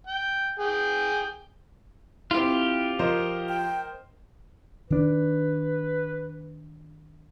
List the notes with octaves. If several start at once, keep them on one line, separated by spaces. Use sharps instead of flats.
G5
G#4 G5
C4 E4 F4 G4
F3 A#4 C5 D#5
G5
D#3 D4 B4